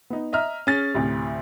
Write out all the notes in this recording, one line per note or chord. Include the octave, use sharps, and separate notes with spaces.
B3 D#4
D#5 E5 A#5 F6
C#4 G#4 A6
D2 A2 C3